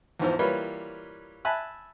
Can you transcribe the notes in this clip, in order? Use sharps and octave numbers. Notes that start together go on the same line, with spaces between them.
E2 G#2 F3
E3 G3 A#3 F4 B4 C#5
E5 G#5 A5 B5 F#6